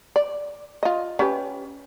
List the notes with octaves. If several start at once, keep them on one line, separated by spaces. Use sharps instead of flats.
D5
F4 D#5
C#4 G4 B4